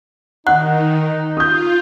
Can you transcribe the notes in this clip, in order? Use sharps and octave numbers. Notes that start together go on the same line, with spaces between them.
D#3 D#4 F#5 F#6
F4 D#6 G6